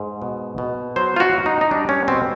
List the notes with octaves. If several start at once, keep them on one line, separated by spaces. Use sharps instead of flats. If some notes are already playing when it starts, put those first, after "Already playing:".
Already playing: G#2
B2
B2
F#3 C5
F4
F#4
F#3
D#4
D#4
G3 D4
C#4
B2 C4